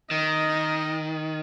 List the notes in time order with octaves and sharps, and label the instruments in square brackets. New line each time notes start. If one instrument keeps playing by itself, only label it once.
[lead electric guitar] D#3 [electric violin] D#5